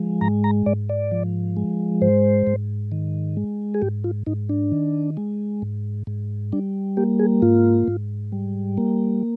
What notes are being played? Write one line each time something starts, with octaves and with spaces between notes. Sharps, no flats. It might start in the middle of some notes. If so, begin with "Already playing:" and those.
Already playing: F3 G#3
G#2 A#5
A#5
G#2 D5
D5
F3
G#3
G#2 C5
G#2
D#3
G#3
G#4
G#2 G4
F4
G#2 D#4
D4
D#3
G#3
G#2
G#2
G3 D4
A#3 G4
G#4
G#2 F4
G#2
G3
A#3